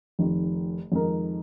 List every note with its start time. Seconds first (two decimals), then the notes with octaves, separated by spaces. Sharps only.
0.19 F1 F2 D#3
0.92 F2 D#3 G#3 D#4 A#4